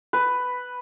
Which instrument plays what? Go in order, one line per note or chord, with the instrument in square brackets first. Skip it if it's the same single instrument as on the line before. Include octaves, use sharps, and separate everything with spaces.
[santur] B4